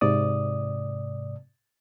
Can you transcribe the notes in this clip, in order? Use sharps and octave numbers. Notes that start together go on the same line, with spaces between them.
G#2 C3 D5 D#6